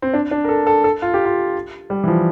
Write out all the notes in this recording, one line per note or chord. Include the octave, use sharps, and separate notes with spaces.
C4
D4
D4
A#4
A4
A4
A4
F4
G4
F4
G3
E3
F3